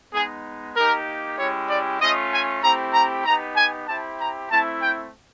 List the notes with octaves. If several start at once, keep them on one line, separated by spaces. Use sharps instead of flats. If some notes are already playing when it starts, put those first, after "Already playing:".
G#3 B3 D#4 G#4
A#3 D#4 G4 A#4
G#3 C#4 E4 G4 C#5
D5
A3 C#4 F4 D#5
G#5
A3 C4 E4 G4 A#5
A#5
B3 D#4 G4 A#5
G#5
C4 E4 G4 A5
A#5
A3 C4 E4 A5
G5